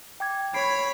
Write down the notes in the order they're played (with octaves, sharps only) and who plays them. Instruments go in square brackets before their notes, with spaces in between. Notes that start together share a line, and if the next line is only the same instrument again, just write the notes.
[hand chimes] G5 D6 G#6
[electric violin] C#5 B5 [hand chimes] G#6 C7 D7